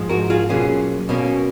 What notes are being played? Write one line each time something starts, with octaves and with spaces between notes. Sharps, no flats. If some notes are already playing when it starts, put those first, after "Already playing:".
Already playing: G#2 F3 G#3
F#4 A#4
F4 G#4
B2 F#3 A#3 C#4 F4 G#4
B2 A#3 C#4